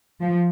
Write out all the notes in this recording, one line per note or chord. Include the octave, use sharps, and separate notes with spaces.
F3